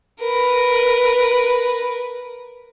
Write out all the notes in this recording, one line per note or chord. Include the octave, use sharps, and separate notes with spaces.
A#4 B4